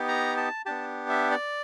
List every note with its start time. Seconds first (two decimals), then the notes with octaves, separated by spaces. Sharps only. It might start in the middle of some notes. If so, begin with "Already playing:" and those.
Already playing: B3 D#4 G4
0.08 A#5
0.37 A5
0.66 B3 D4 G4 A5
1.09 E5
1.31 D5